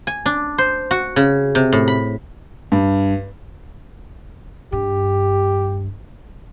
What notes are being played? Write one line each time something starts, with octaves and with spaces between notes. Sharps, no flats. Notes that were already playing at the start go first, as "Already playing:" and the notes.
G#5
D4
C5
F#4
C#3
C3
A2
B5
G2
G2 G4